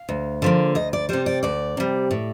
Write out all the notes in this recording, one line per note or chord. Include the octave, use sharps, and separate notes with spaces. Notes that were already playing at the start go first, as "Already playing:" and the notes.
Already playing: F5
D2
D3 F3 A#3
D2 D#5
D5
C3 G3 C5
D5
D2 D5
C3 G3
A2